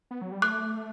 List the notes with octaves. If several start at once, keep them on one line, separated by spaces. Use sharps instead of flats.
B3
F#3
G3
A3 D6 F#6